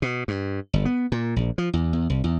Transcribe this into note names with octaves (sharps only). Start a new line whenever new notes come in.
B2
G2
G1
B3
A#2
A#1
F3
E2
E2
C2
E2